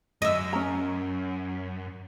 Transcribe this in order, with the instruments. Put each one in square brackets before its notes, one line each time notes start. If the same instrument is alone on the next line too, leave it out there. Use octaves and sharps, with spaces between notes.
[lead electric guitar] F#2 [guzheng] D#5 E5
[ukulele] C#4 A#5